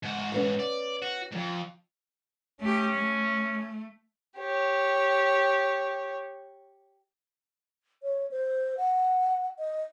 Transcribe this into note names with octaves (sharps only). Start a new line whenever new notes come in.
G#2 F#4
C#4 B4 F#5
D5
F#4
F2 G#2
A3 C#4 G4
A3
G4 C#5
C#5
C5
F#5
D#5